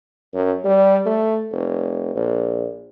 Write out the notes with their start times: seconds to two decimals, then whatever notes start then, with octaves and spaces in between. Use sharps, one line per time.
0.34 F#2
0.64 G3
1.06 A3
1.52 F1
2.15 A#1